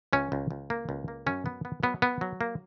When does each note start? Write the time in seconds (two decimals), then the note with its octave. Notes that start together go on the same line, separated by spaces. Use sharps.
0.13 C#2 C#4
0.32 C#2
0.51 C#2
0.70 A#3
0.89 C#2
1.08 A#3
1.26 F#2 C#4
1.46 B3
1.65 B3
1.83 F#3 B3
2.02 B3
2.21 F#3
2.41 A#3